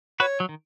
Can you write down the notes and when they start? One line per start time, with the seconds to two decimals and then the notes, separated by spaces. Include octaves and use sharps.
0.20 F#4 B4 C#5
0.40 F#3
0.49 D#3